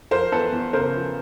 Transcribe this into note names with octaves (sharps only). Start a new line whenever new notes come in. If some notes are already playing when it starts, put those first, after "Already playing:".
F3 A#4 C5
E2 A4 B4
E2
C#3 A#4 C5
F3